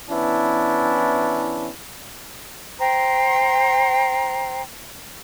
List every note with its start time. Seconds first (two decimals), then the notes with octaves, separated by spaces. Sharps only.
0.10 E3 B3 C#4 D4 E4
2.79 C5 G5 A#5 C6